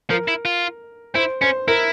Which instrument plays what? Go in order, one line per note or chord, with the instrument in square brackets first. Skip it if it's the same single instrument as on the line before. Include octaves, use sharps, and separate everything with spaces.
[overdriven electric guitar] F3 [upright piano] A#4
[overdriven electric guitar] E4
F4
[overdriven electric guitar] E4 [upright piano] C5
[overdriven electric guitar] C#4 [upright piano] C5
[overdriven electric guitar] E4 [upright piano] A#4